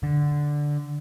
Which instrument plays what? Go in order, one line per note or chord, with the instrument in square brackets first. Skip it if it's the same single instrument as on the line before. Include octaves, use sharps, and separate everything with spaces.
[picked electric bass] D3